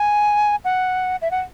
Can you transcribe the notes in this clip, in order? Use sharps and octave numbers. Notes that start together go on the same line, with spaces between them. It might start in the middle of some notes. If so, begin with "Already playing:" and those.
Already playing: G#5
F#5
E5
F#5